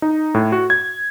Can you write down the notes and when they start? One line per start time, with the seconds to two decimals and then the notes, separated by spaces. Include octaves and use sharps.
0.02 D#4
0.34 A2
0.52 F#4
0.70 G#6